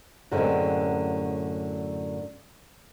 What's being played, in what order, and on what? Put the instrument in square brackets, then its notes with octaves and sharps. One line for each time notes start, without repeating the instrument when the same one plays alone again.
[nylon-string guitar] F#2 A2 D3 G#3 C4 C#4